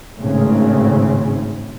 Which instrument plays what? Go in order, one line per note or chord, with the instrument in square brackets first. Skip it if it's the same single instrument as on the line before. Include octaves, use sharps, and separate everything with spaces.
[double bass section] G#1 A2 C#3 C4